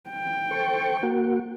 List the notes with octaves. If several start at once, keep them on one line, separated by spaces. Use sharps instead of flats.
G5
A4 C5 C#6
A#3 F#4